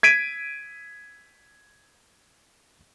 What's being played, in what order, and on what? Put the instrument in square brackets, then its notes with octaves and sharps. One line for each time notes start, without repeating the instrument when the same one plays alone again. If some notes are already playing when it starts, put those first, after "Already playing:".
[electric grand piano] G#6 B6 D7 D#7